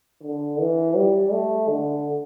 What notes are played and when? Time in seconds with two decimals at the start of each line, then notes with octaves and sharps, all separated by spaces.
0.23 D3
0.60 E3
0.96 G3
1.32 A3
1.69 D3